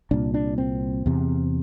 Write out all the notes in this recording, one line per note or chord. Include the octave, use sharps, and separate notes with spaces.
C2 A#2 D4
D4
C4
E2 C3